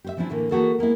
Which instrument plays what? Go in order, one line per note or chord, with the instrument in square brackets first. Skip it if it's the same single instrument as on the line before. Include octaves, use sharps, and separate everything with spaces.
[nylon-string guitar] G4 C5 E5
E3 F3 C4 D4 E4
A2 D3 E3 A#3
E3 A3 A#3 F#4 G#4 A4
G#3 A#3 B3 E4